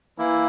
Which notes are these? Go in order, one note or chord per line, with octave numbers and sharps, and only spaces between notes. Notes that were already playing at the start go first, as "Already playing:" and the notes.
E3 A#3 E4